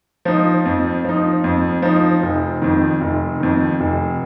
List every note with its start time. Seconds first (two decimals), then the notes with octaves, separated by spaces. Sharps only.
0.25 F3 D#4
0.65 F2
1.05 F3 D#4
1.44 F2
1.82 F3 D#4
2.22 F1
2.62 F2 D#3
3.01 F1
3.40 F2 D#3
3.80 F1